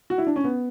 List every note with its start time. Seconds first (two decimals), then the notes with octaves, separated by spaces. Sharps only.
0.10 F#4
0.18 E4
0.27 D4
0.36 C#4
0.44 B3